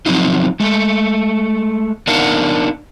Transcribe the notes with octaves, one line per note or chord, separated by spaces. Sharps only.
F3 F#3 C4 D#4 F4
G#3 A3
B3 D4 D#4 A#4 F5 F#5